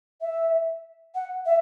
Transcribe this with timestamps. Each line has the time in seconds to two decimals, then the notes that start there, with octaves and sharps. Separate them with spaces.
0.21 E5
1.14 F#5
1.45 E5